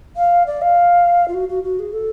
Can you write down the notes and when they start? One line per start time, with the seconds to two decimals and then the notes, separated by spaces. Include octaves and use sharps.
0.16 F5
0.46 D5
0.61 F5
1.28 F4
1.34 F#4
1.49 F#4
1.63 F#4
1.79 G#4
1.92 A4